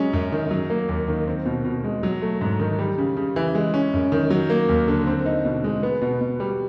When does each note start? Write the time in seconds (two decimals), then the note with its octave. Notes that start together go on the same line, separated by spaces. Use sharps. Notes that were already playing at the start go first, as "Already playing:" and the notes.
Already playing: F#3 G#3 C#4
0.13 F#2
0.32 D#3
0.51 F#3
0.70 A#3
0.88 D#2
1.08 D#3
1.27 C4
1.46 B2
1.65 B2
1.84 G#3
2.03 F#3
2.22 A3
2.41 G#2
2.59 D#3
2.79 G3
2.98 C#3
3.17 C#3
3.36 E3
3.55 G#3
3.74 C#4
3.93 F#2
4.12 D#3
4.30 F#3
4.50 A#3
4.69 D#2
4.88 D3
5.07 C4
5.26 D#4
5.45 B2
5.64 G#3
5.83 B3
6.02 B2
6.21 B2
6.40 G3